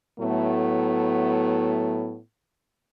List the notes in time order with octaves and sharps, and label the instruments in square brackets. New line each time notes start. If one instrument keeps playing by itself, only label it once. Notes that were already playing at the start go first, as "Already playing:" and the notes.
[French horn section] A2 F#3 A3 B3